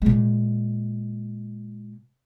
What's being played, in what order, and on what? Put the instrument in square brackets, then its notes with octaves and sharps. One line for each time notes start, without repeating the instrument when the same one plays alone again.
[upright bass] A#2 G#3